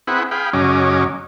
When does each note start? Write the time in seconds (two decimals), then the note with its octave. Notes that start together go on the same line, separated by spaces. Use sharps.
0.07 C4 E4 G#4 B4 F#5
0.31 G#4 F5 G5 B5
0.53 F#2 C#3 F#3 C#4 D#5 D6